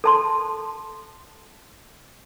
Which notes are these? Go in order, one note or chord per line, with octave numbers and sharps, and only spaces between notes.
A4 A5 C6